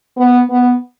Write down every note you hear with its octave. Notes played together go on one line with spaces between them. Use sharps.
B3
B3